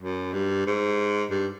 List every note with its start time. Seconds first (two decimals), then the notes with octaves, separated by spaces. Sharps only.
0.02 F#2
0.33 G2
0.67 G#2
1.30 G2